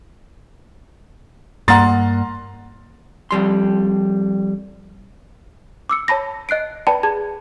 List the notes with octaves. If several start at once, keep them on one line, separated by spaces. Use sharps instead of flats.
G2 A#3 F#5 A#5 C6 A6
F2 G3 C6
D6 E6 C#7
C#5 A5 B5 A#6
D#5 F#6 C7 D7
B4 D5 G5 A5 B5
G#4 A5 G#6